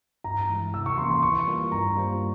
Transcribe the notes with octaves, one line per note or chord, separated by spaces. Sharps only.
G2 A#5
E3 G#3 E4
C3 E6
C#6
E3 A#3 C#4 C6
C6
E3 C#6
G3 A#3 F4 A#4
G2 A#5
G3 A#3 F4 C5